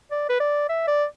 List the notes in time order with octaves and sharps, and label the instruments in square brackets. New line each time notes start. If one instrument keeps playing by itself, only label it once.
[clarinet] D5
B4
D5
E5
D5